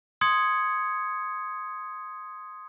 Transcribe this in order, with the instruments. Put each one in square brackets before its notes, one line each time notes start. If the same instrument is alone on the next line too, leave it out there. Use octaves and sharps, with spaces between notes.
[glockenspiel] C6 D#6 G#6 C#7